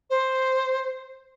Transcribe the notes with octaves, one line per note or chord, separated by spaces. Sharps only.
C5